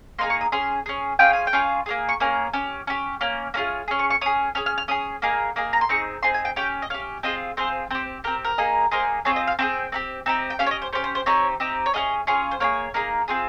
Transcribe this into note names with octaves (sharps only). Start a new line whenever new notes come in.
A#3 D#4 G#4 C6
C#6
D#6
C#4 G#4 C6
C#4 G#4
C#4 F4 G#4 G5
G#5
G5
C#4 F4 G#4
A#3 C#4 G#4
C#6
A#3 C#4 G#4
C#4 G4
C#4 G4
A#3 C#4
A#3 C#4 F4 G#4
C#4 G#4
C#6
C#6
C#4 G#4 D#6
C#4 G#4 F6
F6
F6
C#4 G#4 D#6
A#3 D#4 G#4
A#3 D#4 G#4
A#5
C6
C4 D#4 G#4 C#6
C4 D#4 G#4 C6
G#5
G5
C#4 G4 G5
D#5
C#4 G4 F5
C4 F4 G#4 D#5
C4 F4 G#4 C5
C4 G4 C5
C4 G4 A#4
A#4
A#3 D#4 G#4
A#3 D#4 G#4 C5
C4 F4 G#4 C#5
D#5
F5
C4 F4 G#4 G5
C4 D#4 G4
C4 D#4 G4
G5
C#4 G4 F5
C#5
D#5
C5
C#4 G4 C5
C5
C5
C4 D#4 G4 C#5
C4 D#4 G4
C#5
C#4 F4 G#4 D#5
C#4 F4 G#4
C5
A#3 D#4 G#4 C#5
A#3 D#4 G#4
C4 F4 G#4